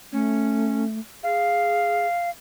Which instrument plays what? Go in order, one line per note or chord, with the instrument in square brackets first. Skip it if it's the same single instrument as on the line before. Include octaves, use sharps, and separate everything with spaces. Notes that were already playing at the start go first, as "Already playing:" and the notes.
[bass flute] A3 [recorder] C#4
[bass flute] G#4 [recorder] F5